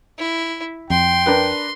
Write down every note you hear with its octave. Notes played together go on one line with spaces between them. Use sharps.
E4
F2 G5 C6
D4 A#4 B4